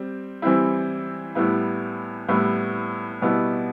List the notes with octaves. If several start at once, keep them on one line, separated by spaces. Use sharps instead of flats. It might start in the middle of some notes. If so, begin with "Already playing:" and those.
Already playing: G3 C4
E3 G3 C4 E4
A2 G3 B3 E4
A2 G3 B3 E4
B2 G3 B3 E4